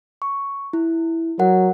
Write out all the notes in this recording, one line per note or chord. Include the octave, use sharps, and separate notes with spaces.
C#6
E4
F#3 A#4 F#5